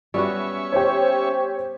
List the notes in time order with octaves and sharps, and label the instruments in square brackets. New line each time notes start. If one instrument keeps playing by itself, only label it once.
[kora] G3 B3 F#4 [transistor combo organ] C#4 E5 C#6
[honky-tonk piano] G4 C5 C#5